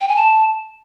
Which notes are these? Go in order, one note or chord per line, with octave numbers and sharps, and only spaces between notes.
G5
G#5
A5